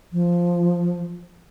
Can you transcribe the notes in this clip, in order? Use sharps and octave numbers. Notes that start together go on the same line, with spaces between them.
F3